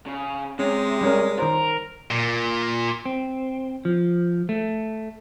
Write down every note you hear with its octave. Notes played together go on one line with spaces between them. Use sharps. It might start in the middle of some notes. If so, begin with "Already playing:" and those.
C#3
C3 G#3 C#4
G3 C#4 A#4
D#3 A#4 C5
A#2
C4
F3
A3